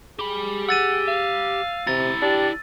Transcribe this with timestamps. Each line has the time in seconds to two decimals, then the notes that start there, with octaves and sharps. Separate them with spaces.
0.19 G4 G#4 B5
0.69 F#5 E6 A6 D#7
1.08 F5
1.87 C3 E4 A#5 A6
2.22 D4 G4